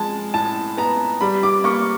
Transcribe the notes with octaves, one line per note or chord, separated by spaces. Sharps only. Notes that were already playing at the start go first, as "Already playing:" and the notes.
Already playing: F3 G#3 A5
A2 A5
B3 A#5
G3 B5
D6
A#3 C#6